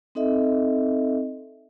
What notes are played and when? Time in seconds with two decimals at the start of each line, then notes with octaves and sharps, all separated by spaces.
0.15 C4 D#4 A4 D#5 E5